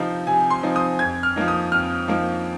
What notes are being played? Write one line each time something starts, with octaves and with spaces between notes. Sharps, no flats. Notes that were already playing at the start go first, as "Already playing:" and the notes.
Already playing: C3 F3 C4 D#4
C3 G#5
C6
F3 C4 D#4
D#6
F2 G#6
F6
F3 A#3 D#4
D#6
F2 F6
F3 A#3 D#4